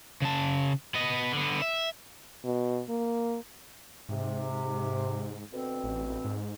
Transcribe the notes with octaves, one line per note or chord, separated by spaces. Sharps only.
C#3 A5
B3 D#5
D3 B3
E5
B2
A#3
G#2 C3
D2 B2 C4
A1
G#2